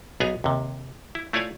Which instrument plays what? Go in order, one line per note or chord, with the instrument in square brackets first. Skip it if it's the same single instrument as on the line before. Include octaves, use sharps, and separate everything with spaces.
[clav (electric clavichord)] B1 B3 G#4 B4 G#5 A#5
D#2 C3
E4
A3 E4 F4 C#5 D5 G#5